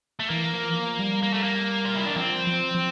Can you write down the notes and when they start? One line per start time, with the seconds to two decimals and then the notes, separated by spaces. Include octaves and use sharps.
0.20 A3
0.29 E3 A#3
0.53 F3
0.69 E3
0.76 F3
0.99 G3
1.23 A#3
1.33 A3
1.43 A#3
1.85 F4
1.95 E4
2.05 D4
2.16 F3 C4
2.47 F3
2.75 F3